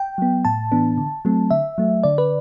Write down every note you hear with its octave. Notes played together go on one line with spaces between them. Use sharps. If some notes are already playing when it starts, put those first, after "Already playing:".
Already playing: G5
F#3 B3
A2 A5
E3 B3 D4
D3
F#3 A3 C4
D3 E5
F#3 A3
D3 D5
B4